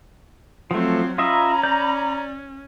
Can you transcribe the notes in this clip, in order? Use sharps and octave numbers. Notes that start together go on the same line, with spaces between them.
F3 F#3 A3 C4 F4
C#4 F4 D#5 E5 A#5 B5
D5 G6